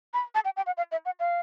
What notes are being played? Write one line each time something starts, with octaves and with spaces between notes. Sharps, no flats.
B5
A5
G5
G5
F#5
F5
E5
F#5
F5